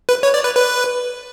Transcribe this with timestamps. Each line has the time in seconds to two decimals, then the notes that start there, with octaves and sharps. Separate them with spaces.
0.09 B4
0.23 C#5
0.34 D5
0.44 B4
0.55 B4